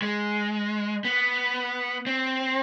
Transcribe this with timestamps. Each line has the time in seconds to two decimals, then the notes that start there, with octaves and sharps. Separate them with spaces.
0.02 G#3
1.05 B3
2.07 C4